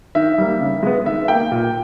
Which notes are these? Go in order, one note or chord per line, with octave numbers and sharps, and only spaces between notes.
D#3 E5
G3 A#3
C#3
G#3 B3
D#3 E5
A#3 G5
A#2